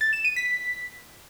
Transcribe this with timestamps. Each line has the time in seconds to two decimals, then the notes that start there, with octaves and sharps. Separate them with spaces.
0.01 A6
0.13 E7
0.25 D#7
0.36 B6